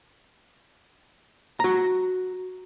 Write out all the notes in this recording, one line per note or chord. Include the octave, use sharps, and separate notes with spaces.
F#4 A#5